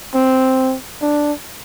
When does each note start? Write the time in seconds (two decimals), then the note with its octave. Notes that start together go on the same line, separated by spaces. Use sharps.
0.15 C4
1.02 D4